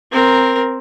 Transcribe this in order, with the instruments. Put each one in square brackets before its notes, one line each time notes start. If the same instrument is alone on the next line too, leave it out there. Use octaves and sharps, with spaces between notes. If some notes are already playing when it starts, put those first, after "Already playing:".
[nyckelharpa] C4 A#4